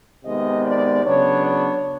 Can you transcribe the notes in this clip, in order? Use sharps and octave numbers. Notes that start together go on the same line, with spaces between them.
C3 D#3 G#3 B3 D#5
D5
C#3 F#3 B3 D4 C#5
C#5